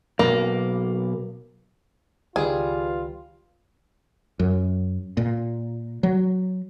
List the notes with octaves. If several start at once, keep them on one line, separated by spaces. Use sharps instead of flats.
B1 F#2 A#3
C#2 D#3 G3 F4 G#4 B4
F#2
A#2
F#3